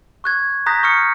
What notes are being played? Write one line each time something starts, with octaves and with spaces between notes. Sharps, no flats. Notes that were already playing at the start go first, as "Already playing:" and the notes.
C#6 F#6 G#6
A#5 D#6 F#6 G6 A#6 B6
C#6 D#6 F6 F#6 C#7